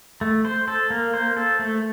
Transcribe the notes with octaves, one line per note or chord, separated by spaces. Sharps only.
A3
C5
A4
A#3
C5
A4
A3